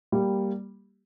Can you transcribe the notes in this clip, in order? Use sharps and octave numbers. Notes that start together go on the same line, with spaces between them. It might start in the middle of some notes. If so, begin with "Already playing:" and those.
G3 A#3 G4